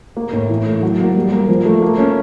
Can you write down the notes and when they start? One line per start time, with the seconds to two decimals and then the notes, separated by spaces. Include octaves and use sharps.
0.17 A#3
0.33 A2
0.49 E3
0.66 A3
0.83 F#3
0.99 A#3
1.16 G3
1.32 A#3
1.49 F3
1.66 A3
1.82 A#3
1.98 C#4